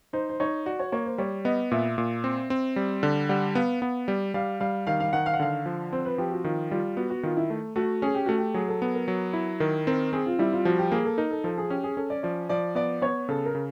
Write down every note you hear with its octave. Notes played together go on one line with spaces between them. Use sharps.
D#4 C5
C5
D#4 C#5
F#4 D5
C#5
A#3 C#5
C5
G3 C#5
B3 D#5
A#2 E5
A#2
C4
C4
G3
D3
G3 F#5
B3 F5
B3
G3
G3 F5
G3 F5
D#3 F5
F5
D#3 F#5
F5
F#5
D3 F5
F3
C4 C5
B4
F3 G4
F#4
D#3 F4
G3 F4
B3 F#4
F#4
D#3 F4
E4
A3
A3 F#4
C#4 G#4
G4
A3 F#4
G4
F#3 G#4
A4
B3 A4
A#4
F#3
E4
D#3 A#4
C4 A#4
C4 G#4
F4
G3 E4
F4
F3 F#4
G4
A#3 G#4
A4
D#4 A#4
A4
F3 A4
G#4
C#4 G4
G#4
C#4 A4
D5
F3 D5
F3 D5
B3 D5
B3 C#5
C#3 A4
A#4
C#3